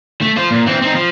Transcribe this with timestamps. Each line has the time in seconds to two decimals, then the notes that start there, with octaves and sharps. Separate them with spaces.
0.21 A3
0.37 F4 C5
0.51 A#2
0.66 E3 C4
0.82 C4 D#4
0.95 F3